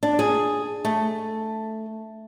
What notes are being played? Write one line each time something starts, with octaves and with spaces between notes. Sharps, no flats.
D4
G#4
A3